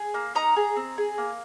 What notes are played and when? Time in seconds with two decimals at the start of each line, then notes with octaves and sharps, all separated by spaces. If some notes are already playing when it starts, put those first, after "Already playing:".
Already playing: G#4
0.14 A#3
0.35 D#4 A#5 D#6
0.56 G#4
0.76 C4
0.98 G#4
1.18 A#3